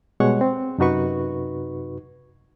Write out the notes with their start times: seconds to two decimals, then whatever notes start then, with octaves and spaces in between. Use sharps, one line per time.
0.20 B2 G3 G#3 C#5 F#5 C#6
0.41 C4
0.78 F#2 C3 D#4 F#4 B4 C#6